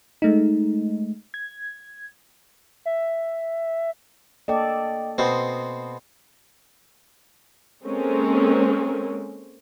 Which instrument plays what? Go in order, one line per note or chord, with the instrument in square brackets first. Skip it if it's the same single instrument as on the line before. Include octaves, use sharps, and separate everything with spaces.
[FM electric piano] G#3 A3 D#4
G#6
[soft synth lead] E5
[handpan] A#3 A4 D5 [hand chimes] D#5 G5
[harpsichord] B2 C4 [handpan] D#5 [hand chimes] C6
[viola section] G#3 A#3 C4 C#4 A4 A#4